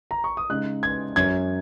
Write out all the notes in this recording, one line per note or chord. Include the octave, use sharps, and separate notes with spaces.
A#5
C#6
D#6
C#3 G#3 D#4 F#6
G#6
F#2 F#3 C#4 G#6